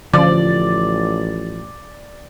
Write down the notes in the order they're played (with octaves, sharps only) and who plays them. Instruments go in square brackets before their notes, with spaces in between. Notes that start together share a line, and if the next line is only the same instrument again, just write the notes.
[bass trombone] A1 [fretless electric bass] D3 C#4 [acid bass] F3 [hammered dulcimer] D5